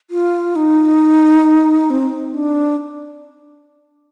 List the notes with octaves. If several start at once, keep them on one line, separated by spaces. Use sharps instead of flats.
F4
D#4
C4
D4